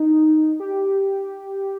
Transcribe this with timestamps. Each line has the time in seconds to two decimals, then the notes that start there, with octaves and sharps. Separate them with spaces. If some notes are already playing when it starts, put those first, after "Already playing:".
Already playing: D#4
0.60 G4